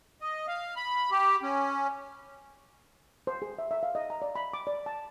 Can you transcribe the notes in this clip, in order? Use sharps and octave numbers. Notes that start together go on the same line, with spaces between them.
D#5
F5
B5
G4
C#4
C5
G#4
E5
E5
F5
D#5
A#5
D5
B5
D6
D5
A5